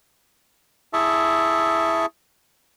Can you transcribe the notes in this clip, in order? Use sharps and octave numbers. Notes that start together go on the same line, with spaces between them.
E4 G#4 E5 A5 C#6